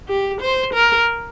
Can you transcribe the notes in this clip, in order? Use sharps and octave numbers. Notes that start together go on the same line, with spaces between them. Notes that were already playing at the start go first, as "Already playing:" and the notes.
G4
C5
A#4